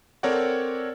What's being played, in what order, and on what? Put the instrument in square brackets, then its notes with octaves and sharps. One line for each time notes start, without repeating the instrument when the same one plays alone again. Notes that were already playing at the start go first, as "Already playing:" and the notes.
[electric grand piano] C4 A4 A#4 C#5 D5 F#5